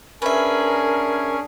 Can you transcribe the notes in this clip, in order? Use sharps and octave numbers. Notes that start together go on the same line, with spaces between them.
C#4 D4 G#4 A#4 B4 E5